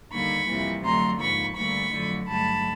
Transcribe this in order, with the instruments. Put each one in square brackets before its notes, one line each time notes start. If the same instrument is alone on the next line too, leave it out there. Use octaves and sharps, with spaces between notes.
[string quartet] D#2 D3 G3 A#3 B5 C#6
F2 C3 E3 G3 A#3
F2 D3 F#3 A3 A#5 C6
G#2 F3 A#3 B5 C#6
D2 D3 G3 A#3 B5 C#6
F2 D3 F#3 A3
G2 D3 F#3 A3 A5 B5